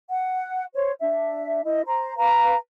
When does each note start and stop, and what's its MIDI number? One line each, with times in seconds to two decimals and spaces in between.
0.09 0.64 78
0.74 0.92 72
0.74 0.92 73
1.00 1.62 62
1.00 1.62 76
1.63 1.82 64
1.63 1.82 75
1.86 2.16 72
1.86 2.16 82
2.17 2.55 71
2.17 2.55 77
2.17 2.55 82